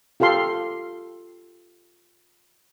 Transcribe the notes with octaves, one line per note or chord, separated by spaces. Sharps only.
F4 G4 A4 F5 C6